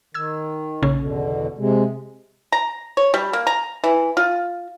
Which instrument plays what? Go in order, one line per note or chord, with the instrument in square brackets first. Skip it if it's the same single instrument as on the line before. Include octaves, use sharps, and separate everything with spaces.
[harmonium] D#3 [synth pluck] E6 G#6
[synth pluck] A#1 C#3 C#4
[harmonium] E2 B2 D3
C3 G#3
[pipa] A#5
C#5
G3
A#3
A#5
E3
F4